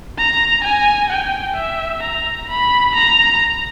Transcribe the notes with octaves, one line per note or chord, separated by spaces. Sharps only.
A#5
G#5
G5
E5
A#5
B5
A#5